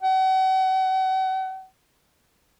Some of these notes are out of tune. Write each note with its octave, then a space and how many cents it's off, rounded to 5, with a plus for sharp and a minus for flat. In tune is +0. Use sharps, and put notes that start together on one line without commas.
F#5 +40